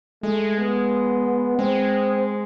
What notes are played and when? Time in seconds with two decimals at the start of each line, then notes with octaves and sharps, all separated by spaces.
0.23 G#3 A3
0.58 B3
1.58 G#3 C4